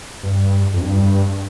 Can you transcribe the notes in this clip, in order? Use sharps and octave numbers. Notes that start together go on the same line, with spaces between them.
G2
F2
G2